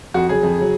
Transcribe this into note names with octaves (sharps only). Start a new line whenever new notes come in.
F2 F#4
C#3 F#3 G#4
F2
C#3 F#3